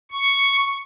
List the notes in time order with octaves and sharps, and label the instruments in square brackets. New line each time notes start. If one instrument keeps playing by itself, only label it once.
[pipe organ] C#6